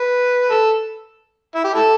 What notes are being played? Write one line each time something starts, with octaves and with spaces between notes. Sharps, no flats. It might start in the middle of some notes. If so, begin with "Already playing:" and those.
Already playing: B4
A4
E4
G4
E4 A4